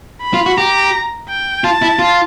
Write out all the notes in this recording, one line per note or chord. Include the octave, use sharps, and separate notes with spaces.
B5
F4
F#4
G4 A#5
G5
F4 A5
E4
F4